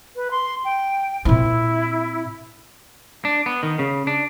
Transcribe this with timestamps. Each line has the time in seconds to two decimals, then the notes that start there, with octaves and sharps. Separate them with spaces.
0.16 B4
0.31 C6
0.65 G5
1.25 A#2 C4 E4
3.25 D4
3.46 B3
3.63 D#3
3.79 C#3
4.07 D4